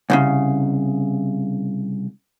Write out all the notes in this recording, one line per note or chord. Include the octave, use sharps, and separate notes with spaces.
C2 A2 C#3